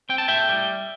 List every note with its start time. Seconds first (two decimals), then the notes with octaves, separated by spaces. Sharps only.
0.09 C4 G5
0.18 A5
0.28 A2 E5 G5
0.49 G3